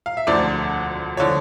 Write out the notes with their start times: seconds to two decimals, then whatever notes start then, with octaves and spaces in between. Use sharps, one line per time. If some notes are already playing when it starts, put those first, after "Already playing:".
0.06 F5
0.17 E5
0.27 E1 D2 D3 F3 D5
1.17 D3 F3 C#5